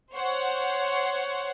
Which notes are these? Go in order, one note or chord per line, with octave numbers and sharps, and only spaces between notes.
C5 C#5 F#5